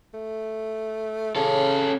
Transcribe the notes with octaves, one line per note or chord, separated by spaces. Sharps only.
A3
C#3 C#4 A4